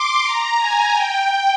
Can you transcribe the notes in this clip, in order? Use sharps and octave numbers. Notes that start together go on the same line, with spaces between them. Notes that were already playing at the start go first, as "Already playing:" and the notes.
Already playing: C6 D6
A#5
G#5
G5